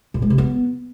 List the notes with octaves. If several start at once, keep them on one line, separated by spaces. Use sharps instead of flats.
A#2
G#3
C3
B3